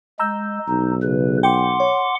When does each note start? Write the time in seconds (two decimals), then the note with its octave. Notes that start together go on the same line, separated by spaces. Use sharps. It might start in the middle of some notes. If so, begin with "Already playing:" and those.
0.19 G#3 A#5 E6 G6
0.68 B1 D#4
1.03 C#3 B4
1.43 F#5 G5 C6 D6
1.80 C#5